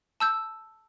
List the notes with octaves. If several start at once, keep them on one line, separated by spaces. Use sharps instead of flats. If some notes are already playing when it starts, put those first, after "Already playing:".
A5 E6 G6